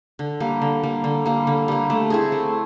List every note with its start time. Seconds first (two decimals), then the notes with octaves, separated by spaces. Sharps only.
0.19 D3
0.40 G3 A#3
0.62 D3
0.84 G3 A#3
1.04 D3
1.26 G3 A#3
1.47 D3
1.68 G3 A#3
1.90 A3
2.10 C4 E4 G#4
2.32 A3